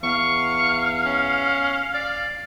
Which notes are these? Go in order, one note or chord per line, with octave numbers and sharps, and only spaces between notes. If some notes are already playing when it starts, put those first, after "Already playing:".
E2 F5 C#6
C#4
D5